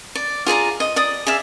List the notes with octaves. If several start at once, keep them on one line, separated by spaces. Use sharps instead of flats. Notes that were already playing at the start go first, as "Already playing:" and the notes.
D5
F4 G#4 D5 A#5
D#5
D5 D#6
G#4 D5 E5 F5